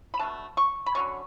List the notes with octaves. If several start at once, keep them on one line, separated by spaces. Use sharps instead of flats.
B5
B2 A3 D4 A5
C#6
B5
D3 F#3 A3 C#4 C#6